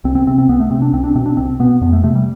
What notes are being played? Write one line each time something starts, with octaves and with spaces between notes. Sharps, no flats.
C2 C4
C4
C3 C4
C4
C2 B3
A3
C3 C4
D4
C2 C4
D4
B2 C4
D4
C2 C4
B2 B3
F2 B3
A3
C3 A3
G3